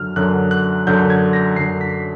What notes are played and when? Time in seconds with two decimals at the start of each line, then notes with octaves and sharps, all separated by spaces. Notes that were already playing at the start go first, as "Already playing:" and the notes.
Already playing: F#2 D3 F#3 F6
0.16 F#2 D3 F#3 F#6
0.51 F#6
0.87 F#2 D3 F#3 G6
1.10 G#6
1.33 A#6
1.56 F#2 D3 F#3 C7
1.81 B6